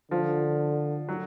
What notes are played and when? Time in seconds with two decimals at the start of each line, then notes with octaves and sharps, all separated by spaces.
0.11 D3 F3
1.09 F#3